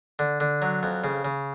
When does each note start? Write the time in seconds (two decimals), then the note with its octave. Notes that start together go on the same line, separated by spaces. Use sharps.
0.19 D3
0.40 D3
0.62 F#3
0.83 F2
1.04 C#3
1.25 C#3